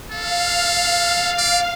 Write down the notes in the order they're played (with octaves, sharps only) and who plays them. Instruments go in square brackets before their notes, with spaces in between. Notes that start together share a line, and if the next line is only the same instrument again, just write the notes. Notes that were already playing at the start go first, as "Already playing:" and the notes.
[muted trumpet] A4 [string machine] F5
[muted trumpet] D5